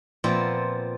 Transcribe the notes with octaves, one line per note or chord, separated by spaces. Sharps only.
A#2 F3 B3 C4 E5